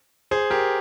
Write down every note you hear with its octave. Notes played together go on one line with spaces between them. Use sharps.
G#4 C5
G4 A#4